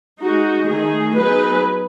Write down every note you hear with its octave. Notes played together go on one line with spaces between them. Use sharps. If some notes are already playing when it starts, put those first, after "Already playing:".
G#3 D#4 F#4
D#3 A3 D#4 G#4
F#3 B3 D#4 G#4 B4